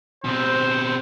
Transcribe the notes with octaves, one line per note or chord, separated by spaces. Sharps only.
B2 C4 C5